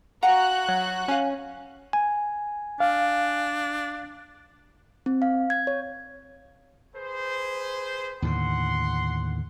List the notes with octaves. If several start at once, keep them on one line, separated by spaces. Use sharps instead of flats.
F#4 F5 F#5 G#5 A#5 F#6
F#3
C#4 F5 G#5
G#5
D4 F5
C4
F5
G#6
C#5
G#4 B4 C5
D#2 A2 D3 F#5 C6